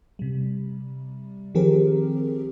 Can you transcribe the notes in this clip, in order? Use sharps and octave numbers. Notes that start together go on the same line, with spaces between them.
C3 G3
D#3 F3 C4 G4 G#4 A#4